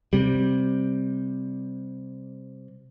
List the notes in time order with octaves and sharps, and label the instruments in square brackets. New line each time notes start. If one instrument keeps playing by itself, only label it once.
[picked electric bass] C3 G3